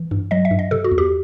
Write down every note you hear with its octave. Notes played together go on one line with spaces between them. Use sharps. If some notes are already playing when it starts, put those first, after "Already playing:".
Already playing: E3
G2
F#3 D#5
E5
G2
D#5
C3 A4
F#4
E2
G4